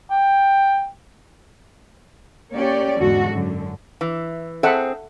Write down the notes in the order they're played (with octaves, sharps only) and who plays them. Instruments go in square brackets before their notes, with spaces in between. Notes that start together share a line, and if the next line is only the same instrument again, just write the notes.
[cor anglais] G5
[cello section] A#3 C#4 G4 C#5 D5
E2 G#2 D3 F#4 A4
F#2 D3
[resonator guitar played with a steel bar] E3
[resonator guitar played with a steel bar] C4 G#4 [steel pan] A4 E5 F#5